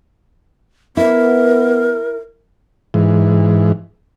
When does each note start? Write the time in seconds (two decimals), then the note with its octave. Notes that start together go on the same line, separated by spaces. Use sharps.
0.97 B3 E4 A#4
2.94 G#2 E3